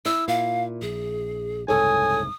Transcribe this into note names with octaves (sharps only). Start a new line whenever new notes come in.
E4 E6
A#2 F5
A#1 G#4
F#1 C2 G#2 A4 C#5 G#5 D#6